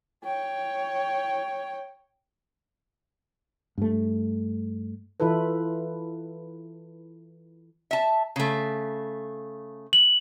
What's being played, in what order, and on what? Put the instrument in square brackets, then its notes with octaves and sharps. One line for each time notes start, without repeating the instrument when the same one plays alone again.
[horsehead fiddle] C#5 G5
[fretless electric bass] G2 A3
[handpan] E3 E4 F4 A4 B4
[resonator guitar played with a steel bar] E5 A5
C#3 A3
[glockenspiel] F#7